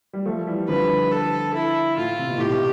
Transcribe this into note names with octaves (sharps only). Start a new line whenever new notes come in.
G3
F3 A3
E3 G3
D3 F3 B4
A4
E4
A2 F4
C3
B2
A2 G4
B2